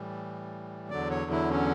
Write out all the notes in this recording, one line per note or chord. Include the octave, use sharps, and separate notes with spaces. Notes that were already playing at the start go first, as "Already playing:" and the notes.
Already playing: A2 E3 G3
E2 D3 F#3 D5
C#5
E4
C#4